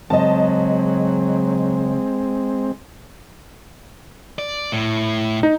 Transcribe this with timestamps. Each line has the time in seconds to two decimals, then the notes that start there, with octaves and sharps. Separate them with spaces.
0.10 C#3 F#3 G#3 C4 D#5 A5
4.39 D5
4.72 A2
5.43 D#4